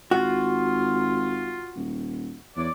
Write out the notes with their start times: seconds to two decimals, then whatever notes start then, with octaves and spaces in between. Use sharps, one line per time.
0.11 G#1 F4 F#4
1.76 D#1
2.56 E2 C#5 D5